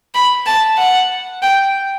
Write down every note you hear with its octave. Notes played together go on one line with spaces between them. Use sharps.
B5
A5
F#5
G5